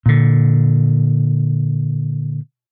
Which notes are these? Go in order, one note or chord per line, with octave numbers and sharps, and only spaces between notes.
A#2 D3